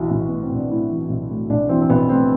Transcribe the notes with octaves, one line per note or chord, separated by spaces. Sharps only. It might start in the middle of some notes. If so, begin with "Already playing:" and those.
Already playing: B1 E3 F#4
B1
A2 B3
C4
B1
D4
A2 E4
E3
B1
A2
B1 D4
E3 C4
C4
B1 B3
A2 C4